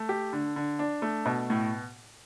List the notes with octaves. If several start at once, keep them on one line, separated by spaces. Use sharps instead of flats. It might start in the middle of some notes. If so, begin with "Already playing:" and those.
Already playing: A3
G4
D3
D3
D4
A3
B2
A2